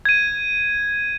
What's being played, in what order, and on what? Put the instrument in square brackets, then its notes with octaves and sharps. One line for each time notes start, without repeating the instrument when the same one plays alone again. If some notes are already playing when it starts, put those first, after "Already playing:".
[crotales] G#6 D#7